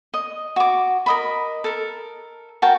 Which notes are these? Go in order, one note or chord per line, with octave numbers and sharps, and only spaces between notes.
D#5
F#4 D6
A#4 D#5 B5
A4 A#4
F#4 A#4 G5 A5